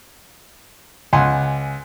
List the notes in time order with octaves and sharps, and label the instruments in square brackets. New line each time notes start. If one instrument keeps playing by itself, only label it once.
[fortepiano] C#2 F#5 G#5 C6